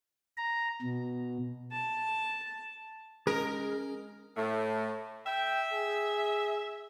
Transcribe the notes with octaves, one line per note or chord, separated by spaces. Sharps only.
A#5
B2
A5
G#3 C#4 G#4 A#4 A#5
A2 A3
E5 G5
G#4